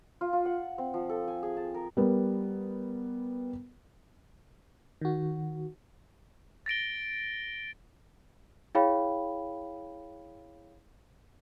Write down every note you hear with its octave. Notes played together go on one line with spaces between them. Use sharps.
F4
F4
F#5
C4
F3
A4
G#5
G#4
A5
A#4
G3 B3 A#4
D#3 F#4
A6 A#6 D7 G7
E4 G#4 C#5 F5 G5 B5